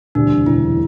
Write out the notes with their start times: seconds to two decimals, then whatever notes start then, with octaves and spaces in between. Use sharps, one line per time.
0.15 E1 D2 C3 E3 G3 D4
0.46 E1 D2 C3 E3 G3 E4